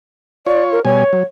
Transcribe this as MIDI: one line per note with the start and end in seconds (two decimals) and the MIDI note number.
0.47 0.80 65
0.47 0.80 73
0.47 0.64 74
0.72 0.84 70
0.85 1.04 47
0.85 1.04 55
0.85 1.21 73
0.85 1.04 80
1.13 1.23 54